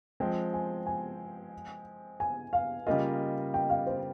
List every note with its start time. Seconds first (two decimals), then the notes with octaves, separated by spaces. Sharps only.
0.20 F3 G#3 C4 G5
0.53 G#5
0.87 G#5
2.20 G#5
2.53 F5
2.87 C#3 G3 A#3 F4 D#5
3.54 G5
3.70 F5
3.87 C5